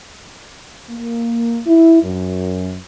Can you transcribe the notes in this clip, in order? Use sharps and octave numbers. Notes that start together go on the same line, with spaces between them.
A#3
E4
F#2